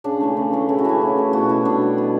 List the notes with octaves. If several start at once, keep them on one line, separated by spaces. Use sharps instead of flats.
C#3 D4
E3 A3
C#3
E3 A3
C#3 E4
F#4
E3 A3 E4
C#3
E3 A3
B2 F#4
G3 E4
B2 D4
G3
B2